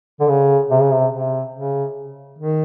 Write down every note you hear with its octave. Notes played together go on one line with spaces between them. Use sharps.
D3
C#3
C3
C#3
C3
C3
C#3
D#3